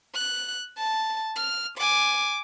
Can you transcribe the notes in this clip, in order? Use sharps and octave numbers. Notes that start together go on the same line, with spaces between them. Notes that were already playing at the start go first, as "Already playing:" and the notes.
F#6
A5
F6
G#5 D6